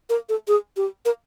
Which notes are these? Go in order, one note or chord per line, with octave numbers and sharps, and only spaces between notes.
A#4
A4
G#4
G4
A#4